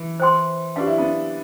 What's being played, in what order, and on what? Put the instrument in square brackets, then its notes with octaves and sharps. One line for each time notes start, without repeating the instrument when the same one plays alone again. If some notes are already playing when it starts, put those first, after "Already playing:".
Already playing: [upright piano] E3
[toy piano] C5 G5 C6
[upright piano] D4 [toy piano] G4 B4 F5
[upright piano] E4
B3 D4